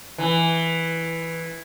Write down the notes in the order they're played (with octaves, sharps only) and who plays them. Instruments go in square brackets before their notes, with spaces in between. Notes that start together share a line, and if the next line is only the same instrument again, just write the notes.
[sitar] E3